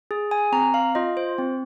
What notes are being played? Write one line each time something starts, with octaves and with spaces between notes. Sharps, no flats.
G#4
G#5
C4 A#5
F5
F4 D#5
C5
C4